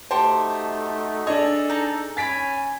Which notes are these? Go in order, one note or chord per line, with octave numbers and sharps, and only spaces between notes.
A3 D#4 F#4 G4 C5 A5 C#6
D4 G#4 A4 C#5 D#5
D#4 A#5
C#4 C#5 G#5 B5 A6 B6 D7